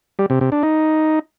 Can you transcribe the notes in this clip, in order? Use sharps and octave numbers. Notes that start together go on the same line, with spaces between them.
G3
C3
C3
D4
D#4